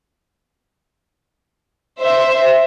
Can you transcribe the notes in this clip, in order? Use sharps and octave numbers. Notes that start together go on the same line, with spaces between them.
C5 E5